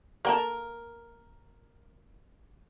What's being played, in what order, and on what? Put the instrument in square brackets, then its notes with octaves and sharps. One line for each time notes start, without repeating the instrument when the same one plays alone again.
[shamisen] A#3 G5 A5 [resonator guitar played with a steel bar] A#4